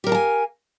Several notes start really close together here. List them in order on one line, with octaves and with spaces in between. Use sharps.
G4 A#4 F5 A5 G#5